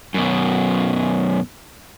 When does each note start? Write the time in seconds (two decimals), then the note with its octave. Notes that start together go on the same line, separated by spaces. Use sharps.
0.14 F#2 B2